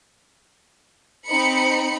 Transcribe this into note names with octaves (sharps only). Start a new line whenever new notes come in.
C4 D#4 B5 C#7